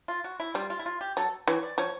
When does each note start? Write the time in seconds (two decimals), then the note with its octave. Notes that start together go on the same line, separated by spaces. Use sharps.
0.08 F4
0.24 F#4
0.40 E4
0.54 G3 F4
0.70 F4
0.79 E4
0.86 F4
1.01 G4
1.17 F#3 A4
1.48 E3 C#5
1.63 D5
1.78 F3 C#5